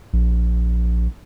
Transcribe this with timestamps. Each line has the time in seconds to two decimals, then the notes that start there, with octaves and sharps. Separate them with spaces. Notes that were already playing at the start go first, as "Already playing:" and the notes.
0.13 A#1